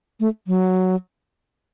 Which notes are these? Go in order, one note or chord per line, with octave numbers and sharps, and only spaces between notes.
A3
F#3